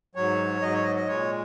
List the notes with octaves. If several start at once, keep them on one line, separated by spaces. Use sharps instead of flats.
G#2 F#3 C#5
G#2 F#3 D#5
C#5
D#5
D#5
A#2 G#3 C#5